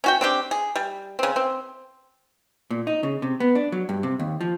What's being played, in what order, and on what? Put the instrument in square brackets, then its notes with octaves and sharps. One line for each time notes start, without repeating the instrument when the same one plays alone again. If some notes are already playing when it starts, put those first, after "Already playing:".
[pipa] C#4 F#4 G5
C4 D4 G4
G#4
G3
C#3 C4
C4
[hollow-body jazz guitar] A#2
D#4
C#3
C3
B3
D4
F#3
G2
C3
D#2
F3